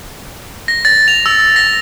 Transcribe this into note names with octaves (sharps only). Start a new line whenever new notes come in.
A#6
A6
F7
E6
A#6